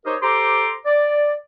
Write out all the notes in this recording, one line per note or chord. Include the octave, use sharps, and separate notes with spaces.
D#4 G4 A#4 C5 C#5 D#5
G4 A4 C5 A#5 C6 D6
D5